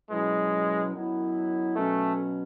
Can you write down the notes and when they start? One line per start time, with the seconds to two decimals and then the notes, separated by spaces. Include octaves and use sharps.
0.10 B2 F#3 G#3 C#4 E4
0.94 F#2 D#3 F#3 B3 E4
1.76 B2 F#3 A3 C#4